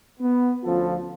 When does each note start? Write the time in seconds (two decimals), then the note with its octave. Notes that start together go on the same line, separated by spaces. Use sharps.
0.20 B3
0.64 D2 F3 C#4 F4 A4